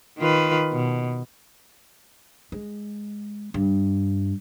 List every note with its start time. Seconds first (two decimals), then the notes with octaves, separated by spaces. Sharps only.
0.19 D#3 F4 B4
0.72 B2
2.52 G#3
3.54 G2